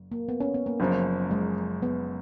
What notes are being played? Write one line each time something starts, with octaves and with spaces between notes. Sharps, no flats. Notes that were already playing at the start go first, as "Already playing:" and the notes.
Already playing: F#1
A#3
B3
C#4
B3
A#3
F#1 F#2 F3
G#3
B3